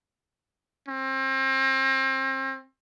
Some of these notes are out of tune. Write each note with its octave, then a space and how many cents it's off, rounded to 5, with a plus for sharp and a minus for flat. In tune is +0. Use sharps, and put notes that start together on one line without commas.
C4 +35